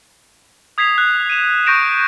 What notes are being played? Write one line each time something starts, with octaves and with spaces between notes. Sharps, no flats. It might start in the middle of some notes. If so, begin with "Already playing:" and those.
D#6 G#6 B6 C7 F7
F#6
D#7 E7
C#6 G6 A#6 D7 E7 F7